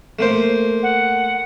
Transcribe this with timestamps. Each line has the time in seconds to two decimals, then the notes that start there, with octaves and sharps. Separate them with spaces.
0.19 A3 A#3 C5
0.83 F#5